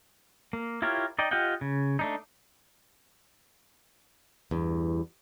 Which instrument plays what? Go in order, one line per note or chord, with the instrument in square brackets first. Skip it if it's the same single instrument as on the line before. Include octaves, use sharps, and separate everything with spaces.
[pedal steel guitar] A#3
E4 F4 G4 A#4 C#5
D#4 D5 D#5 G5
F4 G4 D#5 F#5 G5
C#3
A3 D4 D#4
[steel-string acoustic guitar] E2 G2